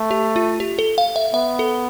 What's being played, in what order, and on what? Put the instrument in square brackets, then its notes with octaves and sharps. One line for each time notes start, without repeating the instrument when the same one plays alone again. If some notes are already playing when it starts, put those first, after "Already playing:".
Already playing: [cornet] A3
[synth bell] G4
F4
G4
A4
F5
E5
[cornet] B3 [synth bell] E5
[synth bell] A4